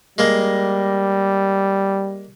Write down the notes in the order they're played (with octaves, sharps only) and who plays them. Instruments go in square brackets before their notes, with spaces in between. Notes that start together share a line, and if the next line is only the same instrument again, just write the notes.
[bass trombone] G3 [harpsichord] G#3 A#3